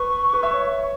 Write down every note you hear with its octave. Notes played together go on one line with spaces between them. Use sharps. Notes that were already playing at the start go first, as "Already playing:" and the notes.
Already playing: B4 C#6
B4
E5
C#5